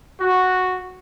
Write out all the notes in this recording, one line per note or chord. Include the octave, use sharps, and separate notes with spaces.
F#4